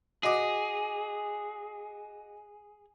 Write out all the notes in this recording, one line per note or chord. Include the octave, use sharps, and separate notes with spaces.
F#4 G#4 D#5 D6